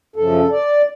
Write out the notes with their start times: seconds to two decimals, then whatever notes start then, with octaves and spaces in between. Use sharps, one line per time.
0.16 F#2 C#3 F3 A4
0.51 D5